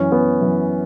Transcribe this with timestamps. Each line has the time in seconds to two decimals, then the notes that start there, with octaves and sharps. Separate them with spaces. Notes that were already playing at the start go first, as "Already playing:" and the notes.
Already playing: F#2 E3 C#4
0.12 B3
0.41 F#2 E3